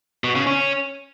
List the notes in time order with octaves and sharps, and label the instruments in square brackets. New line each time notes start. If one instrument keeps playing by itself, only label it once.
[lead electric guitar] B2
C#3
C#4